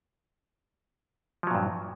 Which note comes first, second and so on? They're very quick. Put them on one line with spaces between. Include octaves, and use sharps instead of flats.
F3 F#3 A#2 G2